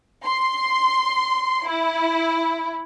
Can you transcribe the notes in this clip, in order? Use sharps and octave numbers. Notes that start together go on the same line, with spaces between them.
C6
E4